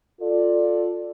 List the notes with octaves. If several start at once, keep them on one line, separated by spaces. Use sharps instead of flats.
F4 A4 D5